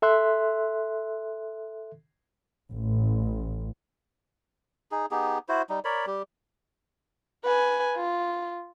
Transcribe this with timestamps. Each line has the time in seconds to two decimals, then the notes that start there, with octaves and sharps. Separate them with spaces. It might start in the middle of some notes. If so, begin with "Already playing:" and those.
0.02 A4 E5 C6 F#6
2.70 A1
4.92 D#4 G#4
5.11 B3 D#4 G4 G#4
5.49 E4 F#4 C5
5.69 G3 D#4
5.85 A#4 C#5 D5 B5
6.07 G3 G4
7.44 B4 G#5
7.96 F4